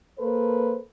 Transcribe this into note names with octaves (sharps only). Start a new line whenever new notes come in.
A#3 A4 B4 C5